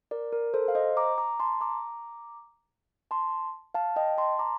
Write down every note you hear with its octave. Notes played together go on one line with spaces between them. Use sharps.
A#4 D5
A#4
A4 C5
F5
C5 D#5
A#5 D6
A#5 D6
A5 C6
A#5 D6
A5 C6
F5 A5
D#5 G5
A5 C6
A#5 D6